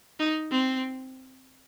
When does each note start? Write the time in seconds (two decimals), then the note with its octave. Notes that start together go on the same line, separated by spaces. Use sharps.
0.20 D#4
0.51 C4